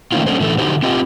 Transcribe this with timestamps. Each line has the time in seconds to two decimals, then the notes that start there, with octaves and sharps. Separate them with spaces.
0.12 D#3 A3 A#3 C#4 D#4 F4
0.27 G3 A#3 C#4 D4 A4 C5
0.40 A2 D3 E3 A3 A4
0.58 D3 D#4 F#4 G4 C5
0.83 C4 F4 G4 D#5